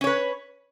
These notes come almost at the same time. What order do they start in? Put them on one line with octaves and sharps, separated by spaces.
C#4 C#5 B4